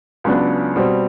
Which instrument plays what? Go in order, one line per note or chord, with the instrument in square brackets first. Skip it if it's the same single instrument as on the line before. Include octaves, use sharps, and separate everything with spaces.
[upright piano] C#2 C#3 F#3 B3 D4
B2 G3 C4